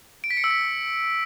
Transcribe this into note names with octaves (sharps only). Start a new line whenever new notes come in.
D7
B6
C#7
E6
B6